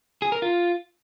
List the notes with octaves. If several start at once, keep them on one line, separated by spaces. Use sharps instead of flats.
G#4
A#4
F4